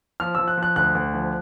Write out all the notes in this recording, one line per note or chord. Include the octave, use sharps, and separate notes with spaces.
F3 F6
F3 E6
F#6
F3
F#6
D2 F#6
D2
F3